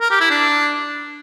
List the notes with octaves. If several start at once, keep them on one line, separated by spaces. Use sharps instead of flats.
A#4
G4
E4
D4